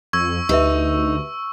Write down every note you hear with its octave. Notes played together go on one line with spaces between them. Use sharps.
F2 C#6 E6 G#6
D2 D#4 G4 B4 E5